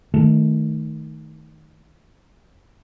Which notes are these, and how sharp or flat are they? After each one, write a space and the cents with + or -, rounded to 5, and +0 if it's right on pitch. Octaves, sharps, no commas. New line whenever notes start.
D#3 +0 A3 -10